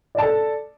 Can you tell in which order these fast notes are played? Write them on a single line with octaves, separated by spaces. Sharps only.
D5 A5 A4